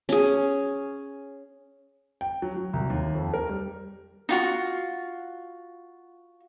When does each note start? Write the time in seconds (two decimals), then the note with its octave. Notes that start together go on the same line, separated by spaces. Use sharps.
0.09 C#4 G#4
2.21 G5
2.42 F#3
2.56 F#3
2.73 C2
2.90 D#2
3.15 F2
3.34 A#4
3.49 G3
4.29 D#4 F4 F#4